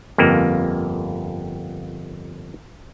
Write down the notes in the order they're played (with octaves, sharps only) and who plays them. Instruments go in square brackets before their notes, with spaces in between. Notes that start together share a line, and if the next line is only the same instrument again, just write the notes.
[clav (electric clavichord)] G1 F2 A#3